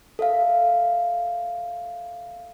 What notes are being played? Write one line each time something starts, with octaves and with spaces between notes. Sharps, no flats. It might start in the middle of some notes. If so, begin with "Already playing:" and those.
A4 E5 F5